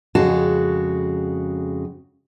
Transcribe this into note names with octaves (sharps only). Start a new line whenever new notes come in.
F2 C#3 G#3 F#4 A5